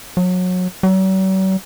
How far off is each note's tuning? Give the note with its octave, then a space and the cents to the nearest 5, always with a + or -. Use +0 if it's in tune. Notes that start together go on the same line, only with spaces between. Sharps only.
F#3 -25
F#3 +45